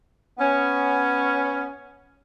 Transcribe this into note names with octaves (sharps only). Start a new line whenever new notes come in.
B3 C#4